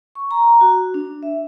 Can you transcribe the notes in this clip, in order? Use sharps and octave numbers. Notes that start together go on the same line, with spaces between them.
C#6
A#5
F#4
D4
E5